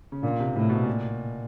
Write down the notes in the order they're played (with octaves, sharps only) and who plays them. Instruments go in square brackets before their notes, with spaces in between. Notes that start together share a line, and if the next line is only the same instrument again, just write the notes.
[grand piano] C#3
[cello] A#2 [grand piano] D3
[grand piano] C3
[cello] A2 [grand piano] C3
[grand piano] B2
A#2